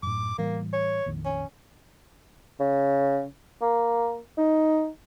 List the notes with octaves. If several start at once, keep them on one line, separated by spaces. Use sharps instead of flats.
F#2 A2 D6
A2 E3 G3 A#3
C#5
A#1 F2 D#3
C#4
C#3
A#3
D#4